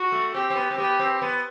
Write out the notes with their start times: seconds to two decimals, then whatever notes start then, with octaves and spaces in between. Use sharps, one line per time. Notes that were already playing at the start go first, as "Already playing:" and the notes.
Already playing: F#4
0.12 A3
0.34 C4 G4
0.50 C4
0.56 B3
0.71 C4
0.77 B3 G4
0.99 C4
1.22 B3